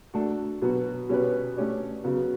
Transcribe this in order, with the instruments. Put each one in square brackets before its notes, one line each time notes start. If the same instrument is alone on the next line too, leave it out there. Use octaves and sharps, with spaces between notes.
[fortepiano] A3 D4 F#4 A4
B2 F#3 B3 F#4
B2 G3 C#4 G4 B4
A3 C#4 G4 D5
C#3 F#3 B3 F#4